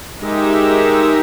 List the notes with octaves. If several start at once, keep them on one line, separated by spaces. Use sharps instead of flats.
G#3 D#4 G4 A#4 E5